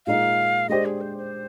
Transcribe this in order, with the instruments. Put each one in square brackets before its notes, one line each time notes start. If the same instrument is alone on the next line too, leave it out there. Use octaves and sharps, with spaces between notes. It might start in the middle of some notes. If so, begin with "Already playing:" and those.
[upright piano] A#2 G#3 D#4 [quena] F5
[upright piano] G#3 D4 G4 C5 [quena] D#5
[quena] G#4
C5
C5